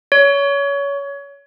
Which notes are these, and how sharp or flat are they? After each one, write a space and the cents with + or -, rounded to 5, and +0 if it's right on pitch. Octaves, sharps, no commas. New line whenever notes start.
C#5 +25